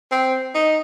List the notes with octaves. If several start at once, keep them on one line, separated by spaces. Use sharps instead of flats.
C4
D#4